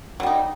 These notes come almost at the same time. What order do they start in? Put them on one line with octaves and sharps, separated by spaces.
F#3 G3 D#4